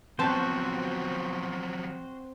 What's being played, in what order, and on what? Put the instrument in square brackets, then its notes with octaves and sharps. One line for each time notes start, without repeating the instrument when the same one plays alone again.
[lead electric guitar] F3 F#3 [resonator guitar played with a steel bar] B3 A5 [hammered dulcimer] C4 G5 [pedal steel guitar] F#4 C5